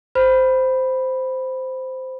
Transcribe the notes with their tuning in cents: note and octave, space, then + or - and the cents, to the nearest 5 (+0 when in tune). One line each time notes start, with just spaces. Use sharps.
C5 -10 B5 -5